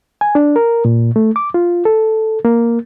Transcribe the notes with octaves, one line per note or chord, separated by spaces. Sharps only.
G#5
D4
A#4
A#2
A3
D6
F4
A4
A#3